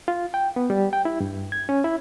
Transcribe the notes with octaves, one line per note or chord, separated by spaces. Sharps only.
F4
G5
B3
G3
G5
E4
G2
G#6
C#4
E4